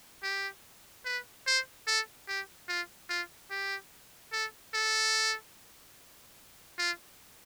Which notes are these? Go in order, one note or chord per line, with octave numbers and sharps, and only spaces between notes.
G4
B4
C5
A4
G4
F4
F4
G4
A4
A4
F4